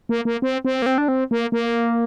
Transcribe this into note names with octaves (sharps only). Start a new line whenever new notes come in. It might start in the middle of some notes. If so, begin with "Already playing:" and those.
A#3
A#3
C4
C4
A#3
C4
D4
C4
A#3
A#3